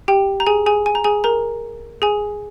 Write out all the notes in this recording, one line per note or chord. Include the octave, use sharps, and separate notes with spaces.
G4 G5
A#5
G#4 G#5
G#4 G#5
G#5
A#5
G#4 G#5
A#4 A#5
G#4 G#5